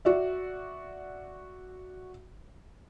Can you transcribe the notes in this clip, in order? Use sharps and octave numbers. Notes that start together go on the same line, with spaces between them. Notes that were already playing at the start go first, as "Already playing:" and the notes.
F#4 D5 E5